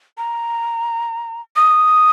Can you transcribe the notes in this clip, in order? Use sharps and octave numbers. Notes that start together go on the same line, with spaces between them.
A#5
D#6